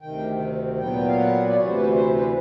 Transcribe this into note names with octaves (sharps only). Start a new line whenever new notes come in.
D2 C3 D#3 G5
A#2 F#3 B3 G5
F5
F#5
D5
D2 C3 E3 C#5
C5
B4
C5
B4